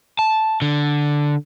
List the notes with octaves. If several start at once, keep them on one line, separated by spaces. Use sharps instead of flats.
A5
D3